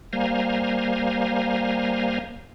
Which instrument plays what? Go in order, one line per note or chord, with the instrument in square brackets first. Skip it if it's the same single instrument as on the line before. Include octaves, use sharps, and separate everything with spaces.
[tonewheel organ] G3 A#3 C5 F5 G#5 A#5